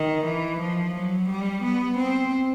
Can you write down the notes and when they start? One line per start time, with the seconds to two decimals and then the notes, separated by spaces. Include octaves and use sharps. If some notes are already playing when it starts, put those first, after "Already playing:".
Already playing: D#3
0.25 E3
0.60 F3
0.94 F#3
1.29 G3
1.63 B3
1.98 C4